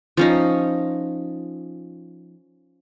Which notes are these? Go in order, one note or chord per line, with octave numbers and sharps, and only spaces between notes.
F3 C#4 D#4